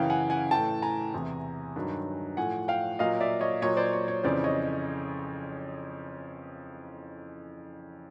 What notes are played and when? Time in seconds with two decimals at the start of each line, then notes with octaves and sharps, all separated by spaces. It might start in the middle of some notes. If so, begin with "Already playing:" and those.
Already playing: F#2 C#3 E3 F5 G5
0.10 F#5 G#5
0.30 F#5 G#5
0.51 A2 E3 G5 A5
0.82 G#5 A#5
1.14 E2 C3 E3
1.76 G2 D#3 F#3
2.37 A2 F3 F#5 G#5
2.68 F5 G5
2.99 A#2 F#3 D#5 F5
3.21 D5 E5
3.41 C#5 D#5
3.62 A#2 F#3 C#5 D#5
3.77 C5 D5
3.93 C#5
4.08 C#5
4.24 F2 C#3 E3 C5 D5
4.44 C#5 D#5